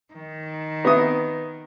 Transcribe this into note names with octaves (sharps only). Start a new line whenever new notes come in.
D#3
B3 D#6